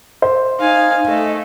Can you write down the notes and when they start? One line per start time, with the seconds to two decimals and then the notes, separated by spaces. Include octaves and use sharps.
0.22 C5
0.60 D#4 F5 G#5
1.07 A3 D#5